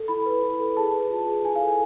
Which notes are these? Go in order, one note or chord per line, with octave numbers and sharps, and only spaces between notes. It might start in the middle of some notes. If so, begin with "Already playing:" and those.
Already playing: A4
E4 B5
B4
E4
A4
G#4 A5
B4
F4
G#4
E4 G#5
F5
A4
G#5